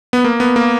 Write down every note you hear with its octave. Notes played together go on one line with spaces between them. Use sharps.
B3
A#3
B3
A#3